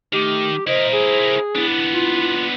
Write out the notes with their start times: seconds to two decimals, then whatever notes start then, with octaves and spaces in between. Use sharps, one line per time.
0.13 D#3 A3 G4
0.67 E4 A#4 C5 D#5
0.92 G#4
1.56 B3 D4 E4
1.93 F4